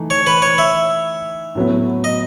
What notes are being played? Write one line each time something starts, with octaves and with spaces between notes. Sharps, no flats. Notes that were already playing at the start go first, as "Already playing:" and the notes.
Already playing: E3 A3 D#4
C#5
B4
C#5
E5
A2 F#3 B3
D#5